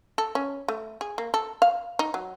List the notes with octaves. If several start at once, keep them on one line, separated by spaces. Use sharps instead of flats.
A4
C#4
A3
G#4
A#3
A4
F5
D#4
F#3